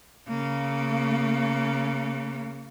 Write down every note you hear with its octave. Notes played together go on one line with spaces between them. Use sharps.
C#3 A#3